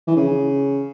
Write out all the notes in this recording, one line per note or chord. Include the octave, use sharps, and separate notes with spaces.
E3
C#3